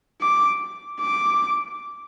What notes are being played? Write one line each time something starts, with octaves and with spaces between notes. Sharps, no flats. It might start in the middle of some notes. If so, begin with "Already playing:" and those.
D6
D6